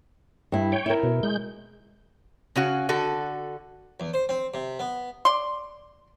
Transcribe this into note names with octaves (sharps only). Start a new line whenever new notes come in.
G2 E4
C#5 G5
E4 A#4
B2
G#3 G6
C#3 C#4 F#4
D3 F#4 A4
E2
C5
C4
C3
B3
D5 C6